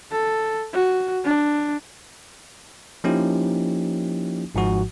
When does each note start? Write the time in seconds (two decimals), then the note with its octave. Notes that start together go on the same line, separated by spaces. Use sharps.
0.11 A4
0.73 F#4
1.24 D4
3.04 F3 A#3 C#4 D#4 E4 G4
4.55 G#1 G#2 F3 F#4